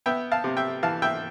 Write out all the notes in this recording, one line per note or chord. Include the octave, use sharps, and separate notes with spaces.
B3 E5 G5
F5 A5
C3
E5 G5
E3 F5 A5
E5 G5